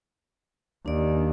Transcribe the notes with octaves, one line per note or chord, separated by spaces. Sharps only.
D#2 D4 D5